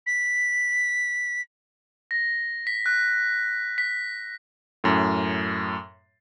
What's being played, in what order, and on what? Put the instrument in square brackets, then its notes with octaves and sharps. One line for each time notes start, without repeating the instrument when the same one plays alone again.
[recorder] B6
[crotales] A#6
B6
F#6
B6
[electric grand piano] F#2 A2